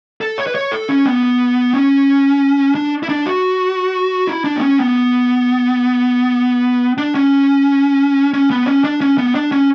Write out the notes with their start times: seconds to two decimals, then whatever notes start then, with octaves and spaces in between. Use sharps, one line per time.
0.21 A4
0.38 C#5
0.47 B4
0.55 C#5
0.71 A4
0.89 C#4
1.06 B3
1.73 C#4
2.75 D4
3.03 E4
3.09 D4
3.26 F#4
4.27 E4
4.44 D4
4.56 B3
4.61 C#4
4.78 B3
6.98 D4
7.15 C#4
8.33 C#4
8.50 B3
8.67 C#4
8.84 D4
9.01 C#4
9.18 B3
9.35 D4
9.52 C#4